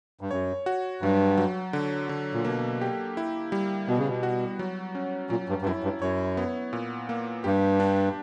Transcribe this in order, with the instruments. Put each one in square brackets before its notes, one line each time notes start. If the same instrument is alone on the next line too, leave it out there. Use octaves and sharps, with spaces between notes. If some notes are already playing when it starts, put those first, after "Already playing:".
[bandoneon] G2
[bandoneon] F#2 [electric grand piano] C#5
[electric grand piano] F#4
[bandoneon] G2 [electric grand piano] F#3
[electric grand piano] F#3
D3
D3
[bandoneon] A#2
[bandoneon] B2 [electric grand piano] A#3
[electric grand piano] G4
E4
G3
[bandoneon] B2 [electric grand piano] B3
[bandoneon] C#3
B2
[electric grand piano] F#4
F#3
C#4
[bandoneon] A#2 [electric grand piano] F#3
[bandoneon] G2
G2
[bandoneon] F#2 [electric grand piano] E4
[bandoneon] G2
[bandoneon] F#2 [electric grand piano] C#5
[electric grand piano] B3
A#2
A#3
[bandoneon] G2 [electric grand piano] G4
[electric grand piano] D4